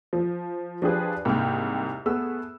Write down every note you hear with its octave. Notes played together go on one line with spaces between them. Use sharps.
F3
F3 D4 F4 G4 G#4 B4
C2 G#2 A#3 G5 F6
A3 B3 G#4 E6